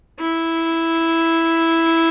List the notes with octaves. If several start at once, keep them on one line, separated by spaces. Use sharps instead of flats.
E4